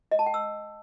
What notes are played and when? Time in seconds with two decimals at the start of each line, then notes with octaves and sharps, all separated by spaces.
0.11 D#5
0.19 A5
0.26 G5
0.34 E6